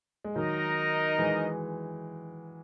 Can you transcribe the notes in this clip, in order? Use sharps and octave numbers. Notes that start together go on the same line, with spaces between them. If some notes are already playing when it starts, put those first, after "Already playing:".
G#3
D#3 F#3 D#4 A#4 D#5
E3 G#3